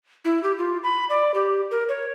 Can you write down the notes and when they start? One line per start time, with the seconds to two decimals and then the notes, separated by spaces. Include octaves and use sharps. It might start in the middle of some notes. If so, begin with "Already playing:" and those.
0.25 E4
0.43 G4
0.58 F4
0.83 B5
1.09 D5
1.34 G4
1.71 A#4
1.89 C#5